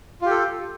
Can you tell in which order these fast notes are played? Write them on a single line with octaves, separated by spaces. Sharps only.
F4 G4 A4